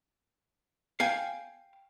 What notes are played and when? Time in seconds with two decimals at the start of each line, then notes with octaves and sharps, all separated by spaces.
1.00 F5 G5 G#5